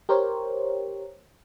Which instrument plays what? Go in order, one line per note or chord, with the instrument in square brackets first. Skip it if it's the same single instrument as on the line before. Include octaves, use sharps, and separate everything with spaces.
[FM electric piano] G4 A#4 C5 C#5